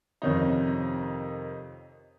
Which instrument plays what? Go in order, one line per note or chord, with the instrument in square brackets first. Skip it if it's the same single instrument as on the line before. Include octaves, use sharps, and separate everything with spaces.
[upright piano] F2 C3 D#3 F3 C#4 D#4